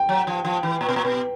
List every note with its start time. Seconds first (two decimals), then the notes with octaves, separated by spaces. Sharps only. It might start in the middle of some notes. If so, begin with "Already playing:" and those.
Already playing: G5
0.09 F#3
0.27 F3
0.45 F3
0.63 E3
0.81 A#2
0.89 B2
0.96 A#2
1.05 B2